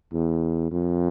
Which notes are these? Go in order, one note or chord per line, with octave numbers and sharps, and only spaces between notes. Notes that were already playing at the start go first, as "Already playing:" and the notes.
E2
F2